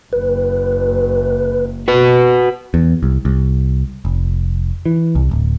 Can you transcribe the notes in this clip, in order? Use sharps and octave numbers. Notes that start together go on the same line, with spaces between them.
F#1 B4
B2 F#4 B4
E2
C2
C2
F1
E3
C2
D1